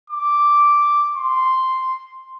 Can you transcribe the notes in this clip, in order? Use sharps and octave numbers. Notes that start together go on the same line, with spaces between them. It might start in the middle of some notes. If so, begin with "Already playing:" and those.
D6
C6